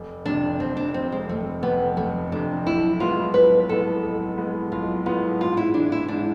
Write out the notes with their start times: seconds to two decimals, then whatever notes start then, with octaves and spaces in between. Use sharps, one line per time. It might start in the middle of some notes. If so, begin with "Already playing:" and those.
Already playing: F1
0.25 F2 C3 D4
0.60 F1 C4
0.77 D4
0.94 F2 C3 C4
1.12 G#3
1.29 F1 A3
1.63 F2 C3 B3
1.97 F1 A3
2.32 F2 C3 D4
2.66 B1 E4
3.00 A2 G#3 B3 F4
3.34 B1 B4
3.69 A2 G#3 B3 A4
4.03 B1
4.37 A2 G#3 B3
4.72 B1 F4
5.06 A2 G#3 B3 F4
5.40 G#2 F4
5.57 E4
5.74 E3 G#3 D4
5.92 E4
6.08 G#2 D4